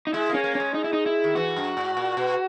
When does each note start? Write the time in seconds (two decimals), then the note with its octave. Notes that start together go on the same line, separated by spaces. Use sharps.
0.07 D#4
0.13 G#3 E4
0.29 A#3 C#4
0.44 A#3
0.55 G#3 C#4
0.74 D#4
0.84 E4
0.93 D#4
1.06 E4
1.24 D#3
1.35 E3 F#4
1.56 F#2
1.77 G#2
1.97 A#2
2.17 B2